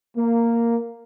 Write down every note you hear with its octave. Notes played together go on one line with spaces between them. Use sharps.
A#3